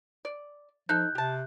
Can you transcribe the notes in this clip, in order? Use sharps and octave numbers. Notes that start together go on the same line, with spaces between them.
D5
F3 D#4 A4 F#6 G6
C3 G4 A5